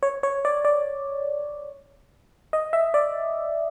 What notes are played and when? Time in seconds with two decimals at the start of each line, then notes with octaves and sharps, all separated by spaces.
0.03 C#5
0.23 C#5
0.45 D5
0.65 D5
2.53 D#5
2.73 E5
2.94 D5